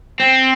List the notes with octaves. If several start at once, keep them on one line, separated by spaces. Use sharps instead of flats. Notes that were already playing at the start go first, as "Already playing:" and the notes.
C4